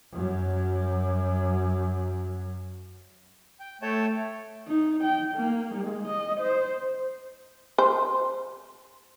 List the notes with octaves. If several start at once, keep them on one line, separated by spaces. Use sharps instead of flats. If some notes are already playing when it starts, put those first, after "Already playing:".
F#2 F#3
G5
A3 C#5 G5 A5
D#4
G5
A#3
G#3
D#5
C5
C5